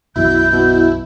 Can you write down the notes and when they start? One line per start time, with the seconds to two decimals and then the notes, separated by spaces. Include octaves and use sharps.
0.16 B1 F#2 B2 E3 E4 G6
0.52 B2